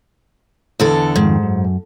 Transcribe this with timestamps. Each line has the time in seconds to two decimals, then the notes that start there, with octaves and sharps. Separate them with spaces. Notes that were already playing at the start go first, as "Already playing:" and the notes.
0.80 E2 D3 A4
1.16 F2 G#2 D#3
1.43 F#2